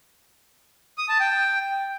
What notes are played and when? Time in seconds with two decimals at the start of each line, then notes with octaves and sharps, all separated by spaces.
0.98 D#6
1.09 A5
1.20 G5